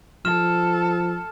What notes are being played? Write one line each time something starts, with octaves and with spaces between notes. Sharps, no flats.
F3 A4 F6 E7